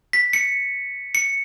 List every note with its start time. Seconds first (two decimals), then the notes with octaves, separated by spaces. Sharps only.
0.13 B6
0.33 C#7
1.15 C#7